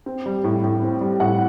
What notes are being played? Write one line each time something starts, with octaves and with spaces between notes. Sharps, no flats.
C4
G3
A2
A2
C4
G3
A2 F#5